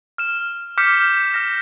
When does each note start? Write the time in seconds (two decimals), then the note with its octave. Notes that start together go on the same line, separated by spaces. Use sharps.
0.18 F6 E7
0.78 D6 F6 G6 B6 C#7
1.34 F6 A#6